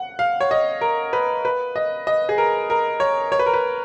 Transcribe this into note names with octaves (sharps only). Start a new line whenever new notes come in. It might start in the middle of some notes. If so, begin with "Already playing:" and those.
Already playing: F#5
F5
C#5
D#5
A#4
B4
B4
D#5
D#5
G#4
A#4
A#4
C#5
C#5
B4
A#4
B4